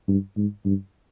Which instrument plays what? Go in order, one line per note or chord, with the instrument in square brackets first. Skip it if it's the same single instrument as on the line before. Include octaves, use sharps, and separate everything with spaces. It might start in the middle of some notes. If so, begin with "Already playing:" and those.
[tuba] G2
G#2
G2